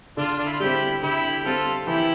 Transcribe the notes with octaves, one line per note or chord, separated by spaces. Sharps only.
D3 D4 F4
D4
E4
F4
G3 C4 E4 G4
D3 E4 G4
G3 C4 F4 A4
E3 E4 G4